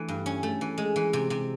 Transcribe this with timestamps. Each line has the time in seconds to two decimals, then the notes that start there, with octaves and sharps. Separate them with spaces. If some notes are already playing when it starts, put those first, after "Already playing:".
Already playing: E3 A3 D4
0.08 G2
0.26 C#4
0.43 A3
0.61 E3
0.78 G#3
0.96 E3
1.13 C3
1.30 C3